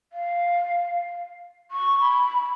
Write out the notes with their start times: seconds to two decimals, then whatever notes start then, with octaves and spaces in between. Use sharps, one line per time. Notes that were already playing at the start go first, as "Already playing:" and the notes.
0.13 F5
1.71 C#6
2.00 B5